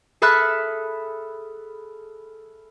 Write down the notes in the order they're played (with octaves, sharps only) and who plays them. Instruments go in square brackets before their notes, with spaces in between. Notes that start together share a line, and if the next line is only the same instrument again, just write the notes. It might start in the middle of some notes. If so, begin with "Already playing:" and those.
[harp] G#4 A4 E5 B5 F6 F#6